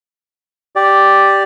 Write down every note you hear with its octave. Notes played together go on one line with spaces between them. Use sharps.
G4 D5